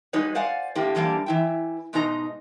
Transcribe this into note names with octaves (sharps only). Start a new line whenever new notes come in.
G3 G#3 D#4 F#4 B4 C#5
C5 D5 F5 F#5 G#5
A2 D3 A#3 G4
D3 E3 G3 A#3 D4
E3 E4 G5
G#2 B2 G#3 D#4 G4 A#5